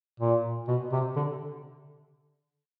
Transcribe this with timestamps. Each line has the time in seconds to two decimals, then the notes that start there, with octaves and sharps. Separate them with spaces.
0.20 A#2
0.68 B2
0.92 C3
1.16 D3